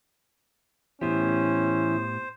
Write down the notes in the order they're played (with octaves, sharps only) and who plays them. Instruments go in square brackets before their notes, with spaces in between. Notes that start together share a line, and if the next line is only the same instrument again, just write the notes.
[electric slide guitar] A2 B3 G4 [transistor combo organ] E3 E4 [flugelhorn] C#4 [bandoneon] C5